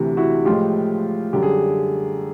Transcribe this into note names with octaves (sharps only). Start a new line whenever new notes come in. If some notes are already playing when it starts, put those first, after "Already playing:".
Already playing: D2 C3 E3
E4 F#4
A2 F3 G#3 F4 G4
F#2 D3 G3 G4
G#4